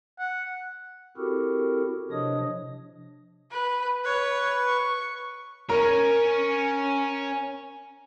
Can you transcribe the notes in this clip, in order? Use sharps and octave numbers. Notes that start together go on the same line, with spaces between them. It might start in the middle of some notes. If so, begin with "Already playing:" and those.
F#5
C4 E4 F#4 G4 A4 A#4
C3 F3 D4 C#5 D#5 D#6
B4
B4 C#5
C#6
C#4 A#4 C#5